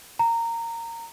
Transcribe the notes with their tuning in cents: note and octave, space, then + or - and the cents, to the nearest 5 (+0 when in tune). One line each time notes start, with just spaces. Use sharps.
A#5 -15